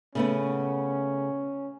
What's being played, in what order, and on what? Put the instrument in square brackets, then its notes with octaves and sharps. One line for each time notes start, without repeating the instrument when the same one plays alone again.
[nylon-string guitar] C#3 A3 B3 [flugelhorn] C#4